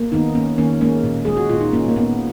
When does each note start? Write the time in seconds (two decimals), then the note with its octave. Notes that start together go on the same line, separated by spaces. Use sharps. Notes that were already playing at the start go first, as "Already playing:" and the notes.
Already playing: A#3
0.12 D#3 B3 D#4
0.35 A#3 C#4
0.58 D#3 A#3 C#4
0.81 G#3 A#3 C#4
1.04 A#2
1.25 G#3 G#4
1.37 F#4
1.50 A#2 F4
1.61 D#4
1.73 A#2 A#3 C#4
1.88 A#3
1.96 A#2 B3